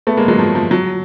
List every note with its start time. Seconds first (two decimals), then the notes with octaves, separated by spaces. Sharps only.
0.07 A3 B3
0.17 G#3 A#3
0.28 F#3 G#3
0.39 F3
0.55 F3
0.71 F#3